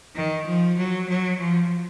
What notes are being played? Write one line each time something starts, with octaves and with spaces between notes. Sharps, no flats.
D#3
F3
F#3
F#3
F3